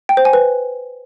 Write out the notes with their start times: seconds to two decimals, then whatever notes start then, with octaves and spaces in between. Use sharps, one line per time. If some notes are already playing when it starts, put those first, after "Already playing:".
0.09 G5
0.17 C5
0.25 G#5
0.33 B4